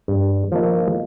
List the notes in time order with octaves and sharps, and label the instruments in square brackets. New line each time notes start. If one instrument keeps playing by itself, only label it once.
[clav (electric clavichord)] G2
F3 A#3 D#4